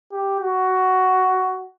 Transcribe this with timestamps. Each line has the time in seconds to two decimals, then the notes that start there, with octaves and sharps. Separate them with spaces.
0.12 G4
0.40 F#4